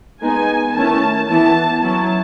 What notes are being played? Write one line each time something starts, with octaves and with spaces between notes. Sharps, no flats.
G#3 B3 D#4 G#5
D#3 A3 C#4 E4 A5
E3 B3 E4 A5
F#3 C#4 E4 A5